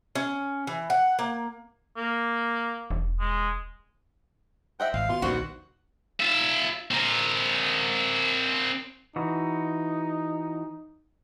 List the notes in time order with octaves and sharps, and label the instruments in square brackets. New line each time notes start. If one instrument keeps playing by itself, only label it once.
[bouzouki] C#4
E3
F#5
A#3
[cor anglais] A#3
[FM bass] E1
[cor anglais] G#3
[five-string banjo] C5 D#5 E5 [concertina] F#5 G5
[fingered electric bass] G#1 [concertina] F5
[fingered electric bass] B2 [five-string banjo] F4 [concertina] C6
[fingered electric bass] A#1 D#2 D#3 [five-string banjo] G3 B3 C4 [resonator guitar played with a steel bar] F#4
[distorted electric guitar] F4 E5
C4 A#4
[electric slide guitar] E3 F#4 [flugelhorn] D#4